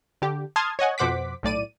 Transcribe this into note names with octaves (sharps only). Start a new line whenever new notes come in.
D3 G4
A5 C6 D#6 F6 G#6
C#5 D#5 F#5 G#5
F2 B2 C5 F#5 D6 B6
B1 A2 D5 D#7